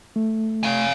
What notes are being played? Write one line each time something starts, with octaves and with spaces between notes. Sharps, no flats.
A3
F5 G#5